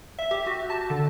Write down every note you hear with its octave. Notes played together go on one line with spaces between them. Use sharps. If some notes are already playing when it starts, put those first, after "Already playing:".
E5
G4
F#4
A5
D3